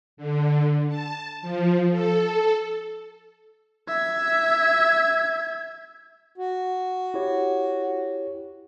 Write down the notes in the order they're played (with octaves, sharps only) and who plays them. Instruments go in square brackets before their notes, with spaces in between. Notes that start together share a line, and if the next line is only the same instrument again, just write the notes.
[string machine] D3
A5
F3
A4
[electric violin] E5 G#6
[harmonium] F#4
[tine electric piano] E4 G4 C#5